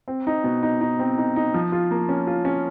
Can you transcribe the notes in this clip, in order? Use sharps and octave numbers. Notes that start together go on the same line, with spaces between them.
C4
D#4
B2
D#4
D#4
C4
D#4
D#4
F3
F4
A#3
C#4
F4
C#4